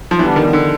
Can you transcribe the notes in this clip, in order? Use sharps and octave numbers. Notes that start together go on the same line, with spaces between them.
F3
D3 E3 G3 B3 D4
D#3
D3